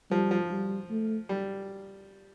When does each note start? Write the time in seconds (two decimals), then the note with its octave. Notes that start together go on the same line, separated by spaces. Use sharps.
0.11 F3 G3
0.31 F3
0.51 G3
0.90 A3
1.29 G3